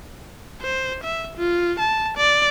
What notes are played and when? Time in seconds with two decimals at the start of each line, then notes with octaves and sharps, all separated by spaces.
0.61 C5
1.04 E5
1.37 F4
1.79 A5
2.17 D5